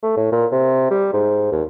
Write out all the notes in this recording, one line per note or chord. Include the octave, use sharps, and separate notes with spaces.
A3
A2
A#2
C3
G3
G#2
D#2